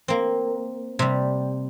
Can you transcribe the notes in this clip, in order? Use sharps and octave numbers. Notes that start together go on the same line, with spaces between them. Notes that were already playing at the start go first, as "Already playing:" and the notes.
A#3 C4
C3 G3